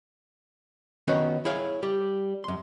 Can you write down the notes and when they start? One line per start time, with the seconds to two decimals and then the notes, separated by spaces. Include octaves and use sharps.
1.08 D#3 B3 C#4 F#4 B4 C#5
1.45 E4 G#4 C#5 F5
1.83 G3 G4
2.44 F#2 C6